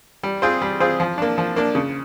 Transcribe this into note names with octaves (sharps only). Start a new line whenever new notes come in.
G3
C4 F4 G#4 C5
G3
C4 F4 G#4 C5
F3
A#3 D4
F3
A#3 D4
C#3